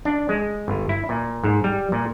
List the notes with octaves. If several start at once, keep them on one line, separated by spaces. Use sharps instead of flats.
D4
G#3
G1
E4
A#2
G#2
G3
A#2